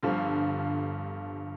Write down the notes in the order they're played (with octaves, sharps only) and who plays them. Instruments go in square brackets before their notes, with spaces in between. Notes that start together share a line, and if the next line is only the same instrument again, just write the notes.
[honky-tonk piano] G1 G2 D3 F3